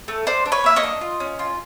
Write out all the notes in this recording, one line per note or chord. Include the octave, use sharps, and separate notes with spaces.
A3
D4 C5 D5
D4
B4 C#5
A#3 E5
C#5 D#5
D4
F4
C#4
F4